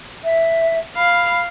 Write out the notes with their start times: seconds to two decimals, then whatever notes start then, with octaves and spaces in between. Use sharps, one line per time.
0.24 E5
0.97 F5 B5